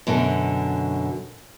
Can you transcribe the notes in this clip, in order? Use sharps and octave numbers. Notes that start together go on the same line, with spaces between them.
F#2 B2 D3 A4